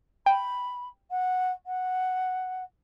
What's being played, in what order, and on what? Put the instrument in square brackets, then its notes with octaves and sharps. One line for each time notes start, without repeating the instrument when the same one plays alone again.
[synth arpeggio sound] G5 [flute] B5
[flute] F#5
F#5